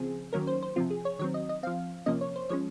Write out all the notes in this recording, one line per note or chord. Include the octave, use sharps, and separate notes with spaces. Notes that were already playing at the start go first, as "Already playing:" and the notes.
Already playing: C#3 F3 C4 G#4
D#3 F#3 A#3 C#4 A#4
C5
C5
C3 F3 C4 F4
G#4
C#5
D#3 F#3 C4 C#5
D#5
D#5
F3 C4 F5
C3 F3 A#3 C#4 D#5
C#5
C5
F3 G#3 C#4 C#5